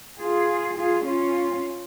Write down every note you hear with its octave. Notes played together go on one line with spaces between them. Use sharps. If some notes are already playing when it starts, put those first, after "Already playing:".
F4 G#4
F4 G#4
C#4 F4